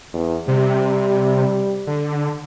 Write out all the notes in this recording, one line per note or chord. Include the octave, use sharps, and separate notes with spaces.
E2
C3 G3
D3